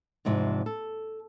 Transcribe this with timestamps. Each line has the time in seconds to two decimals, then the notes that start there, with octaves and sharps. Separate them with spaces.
0.25 E2 G#2 C3 F3
0.66 A4